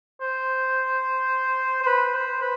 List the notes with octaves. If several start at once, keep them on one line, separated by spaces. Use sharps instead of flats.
C5
C5
B4
C5
B4